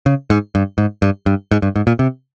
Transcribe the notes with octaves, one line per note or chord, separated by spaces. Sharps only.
C#3
G#2
G2
G#2
G2
G2
G#2
G2
G#2
A#2
C3